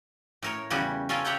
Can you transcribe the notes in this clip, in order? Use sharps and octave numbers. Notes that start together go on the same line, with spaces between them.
A2 A#4 C#5
E2 C#3 G3 F#4 G#5
C#4 F4 A4 A#4 G#5
G4 C#5 E5 F#5 G5